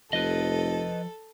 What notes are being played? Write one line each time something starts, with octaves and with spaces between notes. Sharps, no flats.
F1 F3 A4 B4 D#5